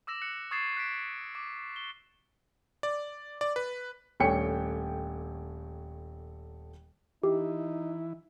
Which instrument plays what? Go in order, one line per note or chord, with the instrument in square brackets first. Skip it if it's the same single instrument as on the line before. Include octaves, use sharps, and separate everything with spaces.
[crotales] D6 E6 A#6 E7
F#6 C#7
C#6 D#6 G#6 A6 C7 E7
F#6 B6 D7 E7
D6
G7
[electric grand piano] D5
D5
B4
[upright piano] D#1 A3 D4 C#5 G5 C#7
[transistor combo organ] E3 E4 [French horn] D#4 [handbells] G4